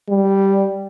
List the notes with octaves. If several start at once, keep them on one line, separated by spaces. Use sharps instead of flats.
G3